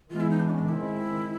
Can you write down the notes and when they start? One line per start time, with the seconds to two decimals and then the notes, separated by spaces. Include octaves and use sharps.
0.11 E3 G#3 B3 F4
0.21 E4
0.30 D#4
0.40 D4
0.50 C#4
0.59 D4
0.68 D#3 G#3 C4 E4